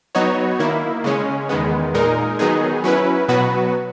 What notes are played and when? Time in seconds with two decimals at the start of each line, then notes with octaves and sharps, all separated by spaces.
0.15 F#3 B3 D#4 F#4 C#5
0.60 D#3 A#3 E4
1.04 C#3 G#3 C#4
1.49 E2 D#3 G#3 B3
1.94 A#2 G#3 D#4 A#4
2.39 D#3 F#3 B3 D#4 G#4
2.84 F#3 C#4 E4 B4
3.28 B2 F#3 B3 F#4 B4